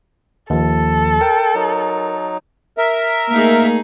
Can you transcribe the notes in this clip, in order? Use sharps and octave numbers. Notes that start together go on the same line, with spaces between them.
D#2 F3 A4
A#4 G5
F#3 D#4
A#4 E5
A3 A#3 D#4 G#4